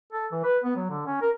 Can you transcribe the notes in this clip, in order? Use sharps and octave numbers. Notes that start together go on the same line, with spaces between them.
A4
E3
B4
B3
F#3
D3
C#4
A#4